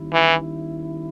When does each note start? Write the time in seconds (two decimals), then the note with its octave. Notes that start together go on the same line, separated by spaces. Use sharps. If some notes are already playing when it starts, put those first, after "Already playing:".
Already playing: D#2 D#3 G3 C#4 E4
0.13 E3